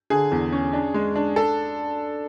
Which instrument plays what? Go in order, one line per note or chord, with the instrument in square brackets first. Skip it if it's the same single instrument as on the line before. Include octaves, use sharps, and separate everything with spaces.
[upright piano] D3 G#4
E2
C#4
D4
G#3
D4
A4